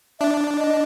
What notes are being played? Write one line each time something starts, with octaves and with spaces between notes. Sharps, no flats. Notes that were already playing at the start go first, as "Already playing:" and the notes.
D4 E5
D#5